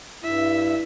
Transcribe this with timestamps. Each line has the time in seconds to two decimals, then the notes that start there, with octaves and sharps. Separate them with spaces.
0.24 G2 E4 E5